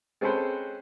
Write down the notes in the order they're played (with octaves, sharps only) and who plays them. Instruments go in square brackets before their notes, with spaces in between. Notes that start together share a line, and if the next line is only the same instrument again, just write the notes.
[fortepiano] G#3 C4 C#4 A4 B4 C5